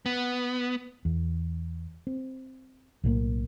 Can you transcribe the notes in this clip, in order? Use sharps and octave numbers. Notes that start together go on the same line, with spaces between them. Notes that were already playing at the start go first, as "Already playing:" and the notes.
B3
E2
C4
B1 A2 F#3 A#3